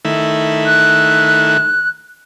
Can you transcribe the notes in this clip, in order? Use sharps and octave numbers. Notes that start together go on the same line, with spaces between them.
D#3 A3 E4
F#6